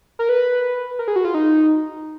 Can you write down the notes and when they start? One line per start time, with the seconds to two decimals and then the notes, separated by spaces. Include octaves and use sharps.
0.19 A#4
0.29 B4
0.99 A#4
1.08 G#4
1.16 F#4
1.24 F4
1.34 D#4